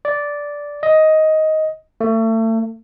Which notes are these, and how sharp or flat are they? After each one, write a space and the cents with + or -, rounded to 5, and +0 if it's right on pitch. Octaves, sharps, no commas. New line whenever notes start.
D5 -10
D#5 +10
A3 +35